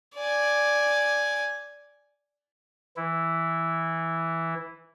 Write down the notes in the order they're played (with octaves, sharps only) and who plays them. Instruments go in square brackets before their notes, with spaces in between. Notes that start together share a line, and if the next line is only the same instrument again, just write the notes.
[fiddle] D5 G#5
[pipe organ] E3 E4